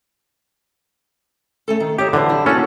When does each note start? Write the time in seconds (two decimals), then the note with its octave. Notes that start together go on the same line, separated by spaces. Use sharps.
1.68 A3 C#4 A4
1.80 D#3
1.98 D#4 G4 C#5 E5
2.13 D3 E3 F#3 C5
2.29 E4 G4
2.46 A#3 C#4 F#4 A4